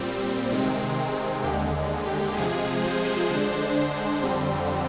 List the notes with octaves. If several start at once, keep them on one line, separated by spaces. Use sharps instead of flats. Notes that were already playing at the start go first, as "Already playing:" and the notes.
Already playing: A#2 G3 C4
C3 D#3 G#3 C4
D#2 D3 G#3 G4
G4
C3 F3 G#3 G#4
C5
D3 G#3 D4
F2 D3 G3 C4